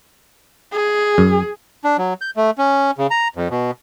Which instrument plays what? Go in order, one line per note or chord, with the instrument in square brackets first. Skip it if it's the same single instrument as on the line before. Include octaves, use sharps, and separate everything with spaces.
[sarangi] G#4
[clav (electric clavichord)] F#2
[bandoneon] D4
F#3
G6
A3
C#4
C#3
A#5
F2
B2